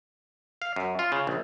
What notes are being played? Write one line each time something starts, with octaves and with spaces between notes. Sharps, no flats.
F5
F#2
F4
C#3
A#1